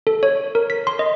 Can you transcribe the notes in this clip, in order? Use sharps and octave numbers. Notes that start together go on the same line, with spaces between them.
A4
C#5
A#4
B6
C6
D#5